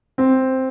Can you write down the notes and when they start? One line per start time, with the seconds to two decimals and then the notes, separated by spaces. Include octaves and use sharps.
0.18 C4